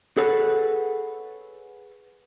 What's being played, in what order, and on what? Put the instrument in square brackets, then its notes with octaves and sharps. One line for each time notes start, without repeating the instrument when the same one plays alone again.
[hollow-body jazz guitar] G#4 A4 B4 C#5 F#5